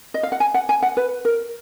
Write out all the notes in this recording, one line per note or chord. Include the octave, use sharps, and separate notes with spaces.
D#5
F5
F#5
G#5
F#5
G#5
F#5
B4
A#4